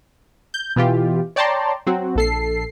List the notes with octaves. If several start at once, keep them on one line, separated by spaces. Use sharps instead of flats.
G6
B2 E3 F4 G4
C#5 D5 G5 A5 A#5 C6
F#3 C4 F#4
A#1 A4 C7